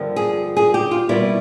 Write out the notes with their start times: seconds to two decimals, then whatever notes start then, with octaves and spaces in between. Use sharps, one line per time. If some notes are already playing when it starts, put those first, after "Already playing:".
Already playing: G2 D3 F3 A#3
0.16 G#4
0.57 G#4
0.74 G4
0.91 F4
1.09 B2 G3 A#3 E4